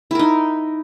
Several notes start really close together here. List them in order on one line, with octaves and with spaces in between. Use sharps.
E4 A#4 D#4